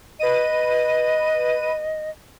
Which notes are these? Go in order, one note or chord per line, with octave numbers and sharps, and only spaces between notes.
B4 D#5 D#7